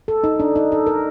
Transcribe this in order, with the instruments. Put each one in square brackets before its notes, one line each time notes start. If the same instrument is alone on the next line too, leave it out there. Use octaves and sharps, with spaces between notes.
[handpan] A4
D#4
D4
D#4
A4
A#4